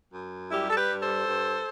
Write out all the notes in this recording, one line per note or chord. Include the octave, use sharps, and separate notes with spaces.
F#2
G3 E4 G4
A4
G4 B4
G2
A4 C5
G2